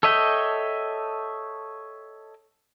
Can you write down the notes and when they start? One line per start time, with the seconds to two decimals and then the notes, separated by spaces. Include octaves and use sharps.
0.03 A4 C#5 D#5 E5 G5